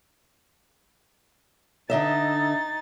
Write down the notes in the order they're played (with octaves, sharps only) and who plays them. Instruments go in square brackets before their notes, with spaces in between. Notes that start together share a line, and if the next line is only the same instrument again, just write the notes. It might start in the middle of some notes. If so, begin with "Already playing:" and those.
[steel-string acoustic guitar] D3 D#5 E5 [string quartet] D#4 A6